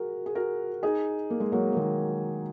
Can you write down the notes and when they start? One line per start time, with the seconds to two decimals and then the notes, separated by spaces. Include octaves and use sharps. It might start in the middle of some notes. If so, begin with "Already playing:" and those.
Already playing: F#4 G#4 A#4
0.26 G#4
0.35 F#4 A#4
0.83 D#4 G#4
1.30 A#3
1.40 G#3
1.52 F#3 A#3
1.72 A#3
1.76 D#3 G#3